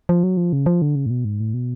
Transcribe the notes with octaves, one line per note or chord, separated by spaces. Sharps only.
F3
F#3
F3
C#3
F3
D3
C#3
A2
B2
G#2
A2
B2